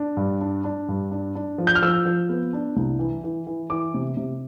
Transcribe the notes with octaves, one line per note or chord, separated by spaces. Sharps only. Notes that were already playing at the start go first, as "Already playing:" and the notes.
Already playing: D4
G2
D4
D4
G2
D4
D4
F3
G6
F6
F3 E6
F3
B3
D4
C2
E3
E3
E3
E3 D6
C3
C3